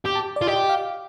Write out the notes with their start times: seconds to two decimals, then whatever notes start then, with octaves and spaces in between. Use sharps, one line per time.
0.05 G4 G5
0.15 A5
0.36 D5
0.41 F4
0.47 G4 D#5
0.69 F5